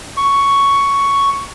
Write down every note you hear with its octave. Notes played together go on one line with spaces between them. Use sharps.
C#6